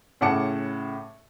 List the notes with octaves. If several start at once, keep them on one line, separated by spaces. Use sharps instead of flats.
A2 C#3 F#5 A5 D6 C#7